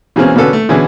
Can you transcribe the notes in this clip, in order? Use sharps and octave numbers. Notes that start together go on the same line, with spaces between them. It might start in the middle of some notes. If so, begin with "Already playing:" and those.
B2 E3 G#3 A#3 C4 C#4
B2 D3 C#4 A4 B4
A3
B2 D3 E3 C#4 E4 G#4